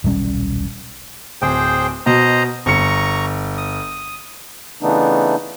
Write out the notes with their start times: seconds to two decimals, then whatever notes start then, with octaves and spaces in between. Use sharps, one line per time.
0.04 D#1 B1 G3 C#4
1.42 D1 G#4 C5 G5
2.06 B2 C5 D#5 A#5
2.66 G1 A#5 C#6 C#7
3.57 D#6
4.82 C#3 E3 A3 B3 D4 D#4